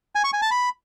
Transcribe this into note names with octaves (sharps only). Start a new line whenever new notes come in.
G#5
C#6
G#5
A5
B5